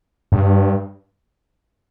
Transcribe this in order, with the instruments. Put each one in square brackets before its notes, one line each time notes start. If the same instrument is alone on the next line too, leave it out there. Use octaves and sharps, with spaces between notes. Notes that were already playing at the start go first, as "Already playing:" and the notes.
[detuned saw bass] G2